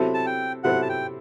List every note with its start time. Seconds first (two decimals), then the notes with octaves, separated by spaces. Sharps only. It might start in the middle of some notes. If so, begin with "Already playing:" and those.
Already playing: C3 F#3 C4 E4 A4
0.14 A5
0.26 G5
0.64 C3 F#3 C4 E4 A4 F#5
0.82 A5
0.89 G5